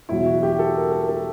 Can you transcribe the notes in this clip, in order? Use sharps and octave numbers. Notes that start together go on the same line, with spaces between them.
E2 B2 F#3 E4
F#4
G4
A4
A#4
A4
A4